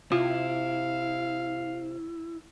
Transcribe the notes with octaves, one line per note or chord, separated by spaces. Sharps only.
C3 E4 F4 F5